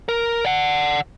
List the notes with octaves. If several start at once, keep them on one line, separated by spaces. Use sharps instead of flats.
A#4
D5 F#5